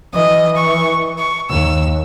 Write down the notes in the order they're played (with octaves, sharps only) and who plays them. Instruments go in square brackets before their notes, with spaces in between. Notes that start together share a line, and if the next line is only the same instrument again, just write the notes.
[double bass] E3 [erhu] D#5
[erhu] C#6
C#6
[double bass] D#2 [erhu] E6